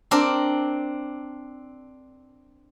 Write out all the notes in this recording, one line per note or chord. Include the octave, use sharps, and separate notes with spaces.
C4 D4 A#4